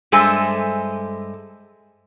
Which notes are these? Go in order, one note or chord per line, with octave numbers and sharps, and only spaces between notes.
G2 G#3 A4 C5 E5 G#5